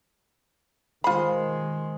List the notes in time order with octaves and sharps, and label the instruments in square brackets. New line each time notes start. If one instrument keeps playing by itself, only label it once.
[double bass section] D#3 G#3 [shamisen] F4 B5 [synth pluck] C5 C6